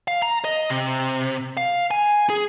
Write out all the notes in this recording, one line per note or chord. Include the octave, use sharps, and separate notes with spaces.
F5
A#5
D#5
C3
F5
G#5
G#4